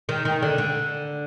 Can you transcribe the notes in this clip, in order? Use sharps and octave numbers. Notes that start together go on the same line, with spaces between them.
D#3
D#3
D3
D3